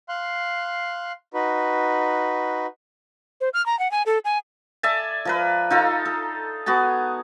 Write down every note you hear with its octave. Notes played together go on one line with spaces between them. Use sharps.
F5 C6 F#6
D#4 F#4 B4
C5
F6
A#5
F#5
G#5
A4
G#5
D5 E5 G#5 A5
F3 A#4 B4
D#4 F4 A4 A#5
A4
B3 F#4 G#4 A5